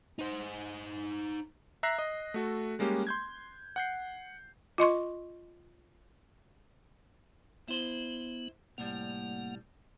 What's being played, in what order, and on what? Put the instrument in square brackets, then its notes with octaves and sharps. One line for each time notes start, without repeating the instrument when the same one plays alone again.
[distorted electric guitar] D#4 C5
[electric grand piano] E5 A#5 F#6 A#6 C7
D#5
A3 F#4 A4
G3 G#3 A#3 C#4 G4
C6 G6 G#6
F#5 G6 C7
[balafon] F4 D#5 C6 C#6
[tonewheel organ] B3 [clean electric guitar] E4 C5
[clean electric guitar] C2 A2 G3 [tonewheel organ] A#3 F#5